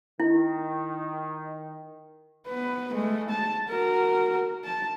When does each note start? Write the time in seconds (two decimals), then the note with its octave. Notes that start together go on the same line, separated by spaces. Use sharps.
0.20 D#3 E4
2.48 B3 B4
2.92 G#3 A3
3.30 A5
3.69 F#4 A#4
4.65 A5